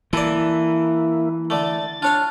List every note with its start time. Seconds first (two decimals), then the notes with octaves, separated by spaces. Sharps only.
0.13 E3 A#3 E4 A4 D5
1.50 D3 A3 A6
2.02 D4 F4 C#5 F5